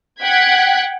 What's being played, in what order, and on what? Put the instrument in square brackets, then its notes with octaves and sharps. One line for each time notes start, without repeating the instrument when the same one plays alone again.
[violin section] F#5 G5 F#6 G#6 B6